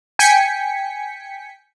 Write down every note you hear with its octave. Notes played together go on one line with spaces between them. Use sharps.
G5 G#5 B6 C#7